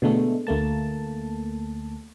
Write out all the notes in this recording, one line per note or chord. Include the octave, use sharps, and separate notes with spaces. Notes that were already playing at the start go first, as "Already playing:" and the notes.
B2 D3 G#3 A3
D2 A3 A#3 A5